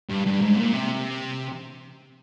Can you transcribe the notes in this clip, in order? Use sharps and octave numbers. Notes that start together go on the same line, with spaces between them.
G2
G2
G#2
A#2
C3